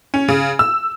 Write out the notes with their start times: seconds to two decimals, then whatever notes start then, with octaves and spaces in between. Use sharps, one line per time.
0.14 C#4
0.28 C#3
0.59 E6